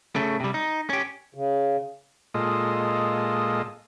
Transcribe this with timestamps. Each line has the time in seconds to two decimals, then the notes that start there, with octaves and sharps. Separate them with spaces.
0.16 C#3 A3
0.40 C3 G3
0.54 D#4
0.90 C#4 G4
1.34 C#3
2.34 A#2 G#3 F4 A4 D#5